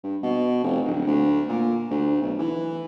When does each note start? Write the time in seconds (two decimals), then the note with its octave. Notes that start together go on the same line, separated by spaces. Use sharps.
0.03 G2
0.23 B2
0.64 F1
0.85 D1
1.07 D2
1.49 A#2
1.91 D2
2.22 B1
2.39 E3